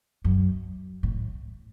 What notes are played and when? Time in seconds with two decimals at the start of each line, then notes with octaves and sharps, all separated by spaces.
0.24 F#2
1.03 A2